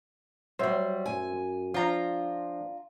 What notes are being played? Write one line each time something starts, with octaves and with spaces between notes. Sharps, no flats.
F#3 G3 C5 E5
F#2 G#5
F3 D4 F4 A#5